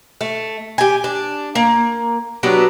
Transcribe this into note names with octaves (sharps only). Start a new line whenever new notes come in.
A3
G4 G#5
D4
A#3
F#3 B3 D4 G4